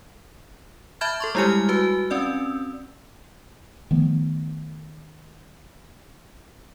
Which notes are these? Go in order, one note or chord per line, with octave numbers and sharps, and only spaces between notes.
E5 A5 B5 F6 G6 G#6
A4 C6 C#6
G3 G#3 E4 G4 G#5 F6
F#4 B4 G#5
C4 C#4 D5 E6
D#3 F3 A3 B3